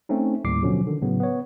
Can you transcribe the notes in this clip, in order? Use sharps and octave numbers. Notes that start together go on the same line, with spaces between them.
A3 C4 C#4 D#4
D#2 A2 G3 D6 C7
B2 D3 F3 F#3 C#4
D3 D#3
A2 C#3 F#3 B3
B3 C#5